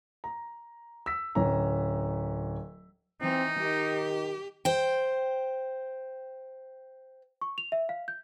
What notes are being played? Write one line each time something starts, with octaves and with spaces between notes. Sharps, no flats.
A#5
E6 B6
D1 C#4 A#5
E3 C4 D#4
D#3 G4
C5 G5
C#6
F7
E5
F5
G6